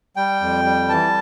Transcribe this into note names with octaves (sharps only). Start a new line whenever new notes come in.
G3 G5
F2
G3
E3 A5